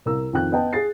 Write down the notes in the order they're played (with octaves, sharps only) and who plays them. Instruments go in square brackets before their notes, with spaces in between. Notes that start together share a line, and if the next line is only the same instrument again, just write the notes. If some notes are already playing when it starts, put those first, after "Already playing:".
[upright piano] C2 A#4 E6
F2 D#3 G5 F#6
B3 D#5 G5 A5
G#4 A6 C7